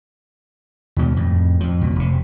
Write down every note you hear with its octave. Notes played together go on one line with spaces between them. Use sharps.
D#2 B2 G#3
F2 A2
F2 F3
C#2 B2
F1 C3